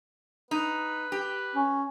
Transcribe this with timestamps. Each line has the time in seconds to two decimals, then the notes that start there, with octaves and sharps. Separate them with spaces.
0.51 D#4 B4
1.12 G4
1.55 C#4